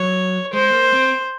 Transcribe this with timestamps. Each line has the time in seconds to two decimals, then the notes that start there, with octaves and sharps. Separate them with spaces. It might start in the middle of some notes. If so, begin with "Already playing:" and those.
Already playing: F#3 C#5
0.53 G#3 C5
0.72 A#3
0.93 C4